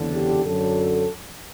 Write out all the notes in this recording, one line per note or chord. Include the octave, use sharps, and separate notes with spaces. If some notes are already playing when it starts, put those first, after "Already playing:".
Already playing: F#1 E2 D3
G4
F#2 D3 F#3 A4